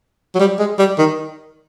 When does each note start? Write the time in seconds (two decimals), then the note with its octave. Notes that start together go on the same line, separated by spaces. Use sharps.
0.35 F#3
0.40 G3
0.59 G#3
0.79 G3
0.98 D#3